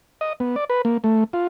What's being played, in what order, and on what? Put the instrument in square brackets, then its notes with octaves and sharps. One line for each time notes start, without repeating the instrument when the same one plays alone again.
[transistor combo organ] D#5
B3
D5
B4
A#3
A3
F4